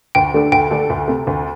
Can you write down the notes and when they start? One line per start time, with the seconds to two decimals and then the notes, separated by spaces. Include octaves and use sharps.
0.15 D2 G5
0.34 D3 A3 D4 A4
0.52 D2 G5
0.71 D3 A3 D4 A4
0.90 D2
1.08 C3 A3
1.27 D2